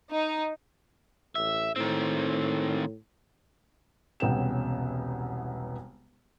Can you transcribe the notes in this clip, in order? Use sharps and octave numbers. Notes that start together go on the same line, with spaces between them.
D#4
A1 E5
A2 D#3 C4
E1 C2 B3 C#4 G5 E7